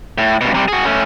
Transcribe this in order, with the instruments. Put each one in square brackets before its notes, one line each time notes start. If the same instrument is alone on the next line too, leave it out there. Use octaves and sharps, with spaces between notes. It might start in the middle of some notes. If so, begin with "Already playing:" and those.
[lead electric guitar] A2
G2 B2
C3 G3
F#4 G#4
A3 C#4